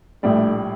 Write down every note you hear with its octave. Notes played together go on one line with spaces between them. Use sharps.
A#1 A2 G3 A3 D4